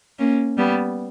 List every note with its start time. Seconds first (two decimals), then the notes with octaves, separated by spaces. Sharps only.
0.19 A#3 C#4
0.58 G3 B3